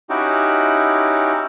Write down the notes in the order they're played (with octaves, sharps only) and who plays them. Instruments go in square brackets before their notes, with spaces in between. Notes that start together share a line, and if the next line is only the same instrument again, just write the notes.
[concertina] C#4 D#4 E4 F#4 G4